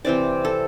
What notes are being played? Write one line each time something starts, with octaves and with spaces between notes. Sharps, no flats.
C3 E3 C4 D5
A4